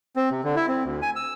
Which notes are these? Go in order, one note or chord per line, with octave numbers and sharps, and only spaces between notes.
C4
C3
D3
E4
C4
D2
G#5
E6